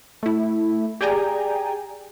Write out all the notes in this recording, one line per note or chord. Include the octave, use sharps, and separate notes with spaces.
A3 E4
G4 G#4 D5 G5 G#5 A#5